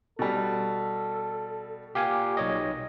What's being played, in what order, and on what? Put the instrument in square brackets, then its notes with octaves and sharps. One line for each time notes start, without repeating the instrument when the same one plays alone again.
[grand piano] B2 G3 [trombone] A4
[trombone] A#2 [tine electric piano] G4 F5 G#5
[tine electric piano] B1 C#5 D#5